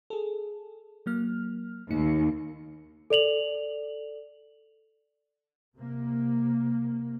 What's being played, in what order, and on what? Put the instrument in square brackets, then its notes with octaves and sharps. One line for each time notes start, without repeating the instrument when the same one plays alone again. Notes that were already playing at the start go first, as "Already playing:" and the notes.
[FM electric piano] G#4 A4
F#3 A#3 F6
[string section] D#2 [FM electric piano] A#3 D#4 C#7
[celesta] A4 D5 F7 F#7
[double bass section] C3 A#3